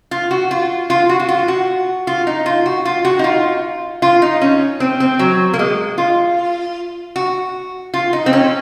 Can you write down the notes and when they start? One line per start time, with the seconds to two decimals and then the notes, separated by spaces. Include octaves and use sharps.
0.11 F4
0.31 F#4
0.51 F4
0.90 F4
1.09 F#4
1.20 F#4
1.29 F4
1.48 F#4
2.07 F4
2.27 D#4
2.46 F4
2.66 F#4
2.85 F4
3.05 F#4
3.19 D#4
3.24 F4
4.02 F4
4.22 D#4
4.41 C#4
4.80 C4
5.00 C4
5.19 F#3
5.54 A#3
5.59 G#3
5.98 F4
7.16 F#4
7.94 F4
8.13 D#4
8.26 C4
8.33 C#4